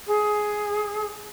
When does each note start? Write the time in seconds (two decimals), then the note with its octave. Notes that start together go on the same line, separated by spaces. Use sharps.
0.07 G#4